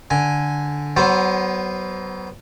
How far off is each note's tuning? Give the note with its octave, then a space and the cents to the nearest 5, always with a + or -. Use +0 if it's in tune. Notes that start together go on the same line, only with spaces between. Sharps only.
D3 +0 G#5 +0
F#3 +35 B3 +0 C5 +10